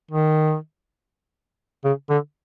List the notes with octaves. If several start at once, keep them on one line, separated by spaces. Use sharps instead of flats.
D#3
C#3
D3